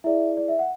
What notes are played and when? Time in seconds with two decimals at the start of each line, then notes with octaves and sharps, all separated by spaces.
0.04 E4 G#4 D5 E5
0.37 D5
0.48 E5
0.59 F#5